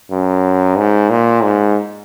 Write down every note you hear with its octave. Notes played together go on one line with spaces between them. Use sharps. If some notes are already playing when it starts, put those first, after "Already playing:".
F#2
G#2
A#2
G#2